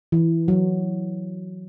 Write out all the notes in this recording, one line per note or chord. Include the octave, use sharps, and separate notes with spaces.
E3
F#3